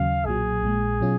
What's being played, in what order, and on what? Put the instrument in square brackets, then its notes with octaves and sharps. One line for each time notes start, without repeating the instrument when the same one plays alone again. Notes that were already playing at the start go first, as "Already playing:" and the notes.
Already playing: [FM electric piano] D#2 C#3 F#3 [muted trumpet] F5
[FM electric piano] B1 A#2 F#3 [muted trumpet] G#4
[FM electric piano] A#1 A#2 G#3
B2 F#3 C#4 F4